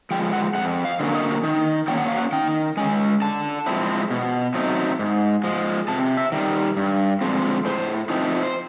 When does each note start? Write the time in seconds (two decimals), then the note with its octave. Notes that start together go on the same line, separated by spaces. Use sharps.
0.11 F3 G#3 G5
0.33 F#5
0.55 F2 F#5
0.85 F5
1.00 D3 F#3 A#3 C#4
1.15 D#5
1.44 D#3
1.88 F#3 A#3 C#4 G5
1.98 F#5
2.08 F5
2.17 F#5
2.32 D#3 G5
2.77 G#3 C#4 G#5
3.22 D3 A5
3.66 F3 G#3 C4 E4
4.10 B2
4.55 F#3 A3 C4 D#4
4.99 G#2
5.44 F3 G#3
5.88 C3 A5
6.17 E5
6.32 D#3 G3
6.76 G2
7.21 D3 F3 G#3 C4
7.65 A2 C5
8.10 F3 A3 C4 D#4
8.43 C5